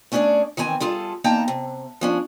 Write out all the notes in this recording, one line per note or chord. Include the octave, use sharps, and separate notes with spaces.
A3 C#4 D4 G4 G#4 D5
D#3 E3 C4 G#5
G3 F4 G#4 A4
E2 A#3 D#4 G5 A5 A#5
C3
F3 C#4 D4